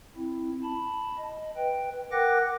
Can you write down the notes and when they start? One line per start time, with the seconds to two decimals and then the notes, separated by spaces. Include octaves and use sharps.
0.17 C4 E4
0.63 A5 B5
1.17 D#5
1.57 B4 G5
2.11 A#4 F#5 G5 D6 F#6 A#6